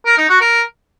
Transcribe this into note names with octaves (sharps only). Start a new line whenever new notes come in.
A#4
D#4
F#4
A#4